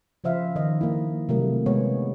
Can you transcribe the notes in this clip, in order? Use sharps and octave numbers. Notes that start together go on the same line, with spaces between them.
C#3 F3 C5 E5 F5
D#3 D#5
A#3 E4
C3 F#3 G3 A3 A#3 A#4
C3 G#3 B3 C#5